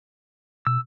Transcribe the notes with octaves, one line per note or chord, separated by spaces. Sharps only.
B2 E6